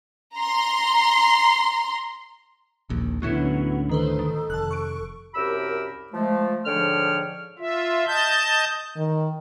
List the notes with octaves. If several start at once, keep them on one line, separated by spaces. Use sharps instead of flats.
A#5 C6
D#1 A#1 D#2
D2 A2 D3 F#3 B3 C#4 E4
D#3 A4 B4 C5
D#3
F1 A5 F#6
C#6 D7
C2 F#2 G4 A#4 B5 E6
F3 G#3 A3
G#2 D3 F3 C#5 G5 F6
F4 E5
D#5 A5 G6
D#3